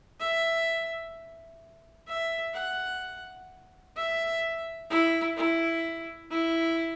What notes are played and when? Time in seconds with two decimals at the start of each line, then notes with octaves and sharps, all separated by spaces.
0.20 E5
2.07 E5
2.54 F#5
3.96 E5
4.90 E4
5.37 E4
6.31 E4